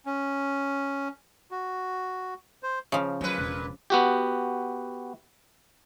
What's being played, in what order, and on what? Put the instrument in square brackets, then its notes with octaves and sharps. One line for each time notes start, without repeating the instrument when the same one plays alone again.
[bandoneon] C#4
F#4
C5
[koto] C#3 F3
[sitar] A#2 B4 [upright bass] F#3
[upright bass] E1
[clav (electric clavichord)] B3 F#4 G4